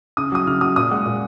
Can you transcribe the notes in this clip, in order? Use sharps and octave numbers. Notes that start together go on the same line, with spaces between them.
C#3 D#6
F#3 D#6
C#3 F6
F#3 D#6
A#2 D#6
G#3 F#5
A#2